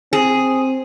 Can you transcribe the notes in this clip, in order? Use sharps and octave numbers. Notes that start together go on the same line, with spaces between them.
C4 G#4